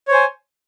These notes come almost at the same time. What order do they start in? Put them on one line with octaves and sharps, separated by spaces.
C#5 C5 G#5